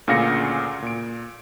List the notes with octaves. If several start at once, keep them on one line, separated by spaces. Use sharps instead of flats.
D2 A#2 C#3 F5 A#6 C#7
A#2 D7